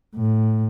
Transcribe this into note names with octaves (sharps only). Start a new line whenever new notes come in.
A2